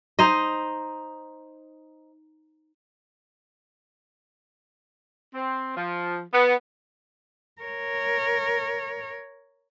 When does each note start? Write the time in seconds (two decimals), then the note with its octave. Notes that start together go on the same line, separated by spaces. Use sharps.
0.19 D#4 C5 D#5
5.34 C4
5.77 F3
6.33 B3
7.62 A#4 C#5